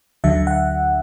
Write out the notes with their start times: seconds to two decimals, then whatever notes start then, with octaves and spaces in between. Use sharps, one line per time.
0.24 D2 D3 F#3 E5
0.47 F#5